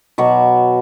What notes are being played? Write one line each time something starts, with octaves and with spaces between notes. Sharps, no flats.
B2 F#3 C#6 D6